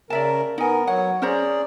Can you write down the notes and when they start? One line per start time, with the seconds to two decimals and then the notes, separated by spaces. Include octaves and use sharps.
0.10 C#3 A#4 D5 E5 A5
0.58 B3 D#4 A#4 G#5
0.87 F#3 C#5 F#5
1.22 C#4 G#4 C5 D5 A#5